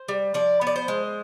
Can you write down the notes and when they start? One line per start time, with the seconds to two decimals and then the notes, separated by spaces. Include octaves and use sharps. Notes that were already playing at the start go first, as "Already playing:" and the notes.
Already playing: C5
0.08 G3
0.34 F3 D5
0.61 B3
0.67 D5
0.76 C5
0.88 G#3